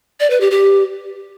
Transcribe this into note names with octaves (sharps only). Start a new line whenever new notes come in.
D5
B4
G4
G4